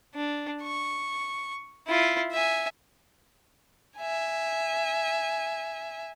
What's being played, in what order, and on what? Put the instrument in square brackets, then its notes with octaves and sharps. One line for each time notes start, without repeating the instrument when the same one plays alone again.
[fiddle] D4
C#6
E4 F4
E5 G#5
[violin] E5 G#5